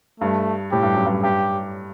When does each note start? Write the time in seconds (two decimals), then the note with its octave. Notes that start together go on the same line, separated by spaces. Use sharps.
0.20 G2 A3
0.72 A2 G4
0.83 G2
0.94 F#2
1.06 G2
1.23 G2 G4